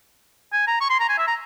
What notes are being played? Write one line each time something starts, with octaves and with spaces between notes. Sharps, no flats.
G#5
A#5
C#6
C6
A#5
G#5
E5
A#5